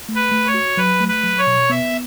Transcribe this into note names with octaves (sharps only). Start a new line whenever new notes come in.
A3
B4
A3
C#5
F#4
F#3 B4
A3
B4
F#3
C#5
B2
B3 E5